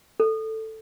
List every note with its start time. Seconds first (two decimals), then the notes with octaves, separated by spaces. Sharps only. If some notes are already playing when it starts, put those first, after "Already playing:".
0.20 A4